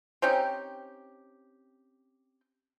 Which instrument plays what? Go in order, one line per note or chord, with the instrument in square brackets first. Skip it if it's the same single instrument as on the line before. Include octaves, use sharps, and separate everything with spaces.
[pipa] C4 C#4 D#4 G4